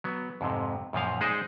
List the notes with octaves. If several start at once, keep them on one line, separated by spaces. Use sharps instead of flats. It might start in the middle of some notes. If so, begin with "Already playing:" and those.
F#3 B3
F2 G#2 C3
F#2 A#2 F3 F5
G#3 D#4 G#4 C5 D5 D#5